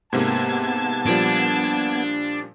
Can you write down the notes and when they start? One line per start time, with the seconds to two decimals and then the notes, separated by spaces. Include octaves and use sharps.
0.13 G#2 C3 A#3 B3 A5 G#6
1.07 A#2 F3 G3 D4